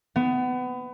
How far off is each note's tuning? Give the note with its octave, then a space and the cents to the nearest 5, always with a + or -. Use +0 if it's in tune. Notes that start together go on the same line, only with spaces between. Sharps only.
B3 +25